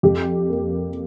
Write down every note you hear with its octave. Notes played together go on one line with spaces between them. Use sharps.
F2 G4
A#3